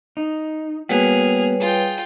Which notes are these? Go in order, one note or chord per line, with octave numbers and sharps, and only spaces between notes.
D#4
G3 A#3 B3 F#4 G#4 B4 C#5 F6
F4 G#4 G5